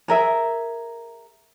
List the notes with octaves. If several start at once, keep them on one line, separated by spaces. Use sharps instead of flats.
G#4 A#4 E5